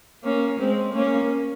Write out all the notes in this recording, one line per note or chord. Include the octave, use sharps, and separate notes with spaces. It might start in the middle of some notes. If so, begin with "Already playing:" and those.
A#3 C#4
G#3 C4
A#3 C#4